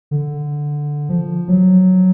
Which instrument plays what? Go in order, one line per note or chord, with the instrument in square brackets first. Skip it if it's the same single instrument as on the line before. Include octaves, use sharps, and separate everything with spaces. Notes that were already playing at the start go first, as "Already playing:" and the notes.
[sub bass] D3
F3
F#3